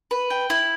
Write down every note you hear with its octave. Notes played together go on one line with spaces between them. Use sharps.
B4
G5
E4